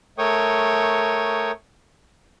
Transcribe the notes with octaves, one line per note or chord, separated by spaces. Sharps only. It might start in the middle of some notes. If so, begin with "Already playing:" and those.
A3 A#4 C#5 G5 C#6 D#6